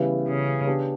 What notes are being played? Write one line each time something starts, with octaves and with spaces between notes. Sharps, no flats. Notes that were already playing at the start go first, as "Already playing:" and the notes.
Already playing: C#3 E3 G3 B3 E4
C#3
B3 D4 G4